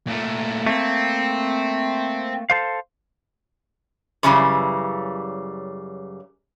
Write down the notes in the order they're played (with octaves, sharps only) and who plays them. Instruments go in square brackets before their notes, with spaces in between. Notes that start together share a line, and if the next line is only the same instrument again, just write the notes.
[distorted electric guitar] A#2 A3
[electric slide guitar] A3 A#3 [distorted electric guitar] C4
[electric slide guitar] A4 C5 F5
[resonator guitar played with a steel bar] F#2 C#3 E3 G3